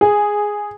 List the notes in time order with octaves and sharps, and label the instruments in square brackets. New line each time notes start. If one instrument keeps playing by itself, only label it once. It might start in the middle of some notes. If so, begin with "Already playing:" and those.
[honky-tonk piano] G#4